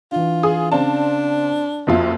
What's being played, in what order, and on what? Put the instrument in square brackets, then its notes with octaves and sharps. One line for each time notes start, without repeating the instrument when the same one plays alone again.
[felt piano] E3 D4 [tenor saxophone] F4
[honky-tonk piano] G#4 D#6
[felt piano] C#3 D5 F5 [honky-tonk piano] C4 A5 [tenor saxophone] D4
[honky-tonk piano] F#1 F2 F4 [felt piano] F#4 E5